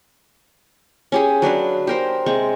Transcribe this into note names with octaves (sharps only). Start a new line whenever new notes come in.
C#4 G4 G#4
F#3 D4 B4 F5
G4 A#4 C5
C3 G#3 C4 C#6